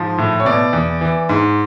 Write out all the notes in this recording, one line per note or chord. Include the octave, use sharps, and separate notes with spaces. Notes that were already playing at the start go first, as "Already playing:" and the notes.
Already playing: G#2 F3
A2
C#5
B2 D5
E2
E3
G#2